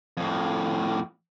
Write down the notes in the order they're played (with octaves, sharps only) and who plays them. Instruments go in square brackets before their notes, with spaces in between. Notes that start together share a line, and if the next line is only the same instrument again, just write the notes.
[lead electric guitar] F2 A2